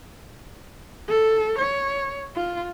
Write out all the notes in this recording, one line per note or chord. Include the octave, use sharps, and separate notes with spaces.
A4
C#5
F4